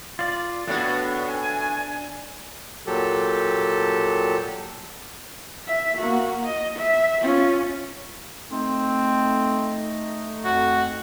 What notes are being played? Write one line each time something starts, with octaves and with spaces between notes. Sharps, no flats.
F4 D5
A2 B3 D4 F#4
G#5
A#2 F#3 G4 A4
E5
A#3 F#4
D#5
E5
C#4 F4
A3 C4 D#4
F2 F#4